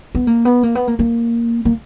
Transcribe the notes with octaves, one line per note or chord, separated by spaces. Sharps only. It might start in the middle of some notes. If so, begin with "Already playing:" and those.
B3
A#3
B3
A#3
B3
A#3
A#3
A#3